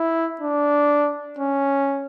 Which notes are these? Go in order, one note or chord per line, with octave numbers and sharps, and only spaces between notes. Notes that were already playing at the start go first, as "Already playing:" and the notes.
Already playing: E4
D4
C#4